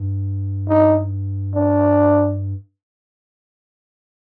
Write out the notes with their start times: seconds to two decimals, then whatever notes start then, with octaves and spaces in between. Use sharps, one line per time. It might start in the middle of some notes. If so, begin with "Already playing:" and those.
Already playing: G2
0.69 D#4
1.55 D4